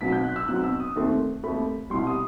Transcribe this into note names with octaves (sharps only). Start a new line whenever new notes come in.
B1 B2 F#3 C4 B6
G6
F#6
E6
B1 B2 F#3 C4 F#6
E6
D#6
D#2 D#3 A3 C4
D#2 D#3 A3 C4 B5
C2 B2 G3 C6
D#6